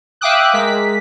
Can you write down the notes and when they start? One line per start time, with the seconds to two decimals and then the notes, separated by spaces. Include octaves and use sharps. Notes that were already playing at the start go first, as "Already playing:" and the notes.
0.21 E5 F5 G5 D6 D#6 F#6
0.53 G#3 A#4 B6